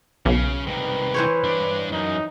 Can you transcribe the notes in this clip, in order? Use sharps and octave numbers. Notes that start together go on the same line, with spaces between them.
B1 C#3
C2 D#3 B4
E3 C5 C#5
G2 D4
F#2 D#4